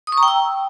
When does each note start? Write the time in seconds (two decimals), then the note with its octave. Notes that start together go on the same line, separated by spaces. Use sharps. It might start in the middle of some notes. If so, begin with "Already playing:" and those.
0.07 D#6
0.12 C#6
0.18 A#5
0.23 G5
0.28 E6